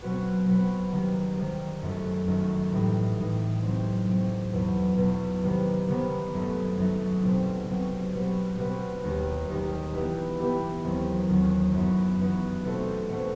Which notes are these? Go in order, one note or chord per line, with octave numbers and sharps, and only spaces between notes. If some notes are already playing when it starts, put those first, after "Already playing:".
B2 F#3 C4 F#4 B4
B2 F#3 C4 F#4 B4
C3 D#3 G3
C3 D#3 G3
F#2 D#3 A3
F#2 D#3 A3
A2 E3 G3 D#4
A2 E3 G3 D#4
C3 F#3 C4
C3 F#3 C4
E2 B2 F#3
E2 B2 F#3
C3 D#3 G3 B3
C3 D#3 G3 B3
F#2 F#3 A3 D#4
F#2 F#3 A3 D#4
C2 B2 F#3 C4
C2 B2 F#3 C4
B2 G3 C4 F#4 B4
B2 G3 C4 F#4 B4
D#2 D#3 G3 D#4 G4
D#2 D#3 G3 D#4 G4
E3 B3 E4 G4 B4
E3 B3 E4 G4 B4
D#2 D#3 F#3 C4
D#2 D#3 F#3 C4
F#2 E3 B3 D#4 F#4
F#2 E3 B3 D#4 F#4
B2 A3 C4 F#4 C5
B2 A3 C4 F#4 C5